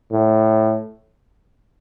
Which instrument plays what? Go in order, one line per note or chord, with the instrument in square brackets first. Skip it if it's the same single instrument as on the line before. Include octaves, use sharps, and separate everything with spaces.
[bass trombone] A2